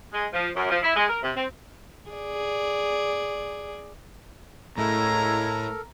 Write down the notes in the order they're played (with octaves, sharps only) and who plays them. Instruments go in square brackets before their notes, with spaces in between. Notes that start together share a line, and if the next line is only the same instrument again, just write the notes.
[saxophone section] G#3
F3
F#2
F3
E4
G#3
A#4
C3
C4
[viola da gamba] G#4 D5
[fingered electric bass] A2 [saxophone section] C#3 G#3 E4 [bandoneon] A4 A#4 [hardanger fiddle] A#5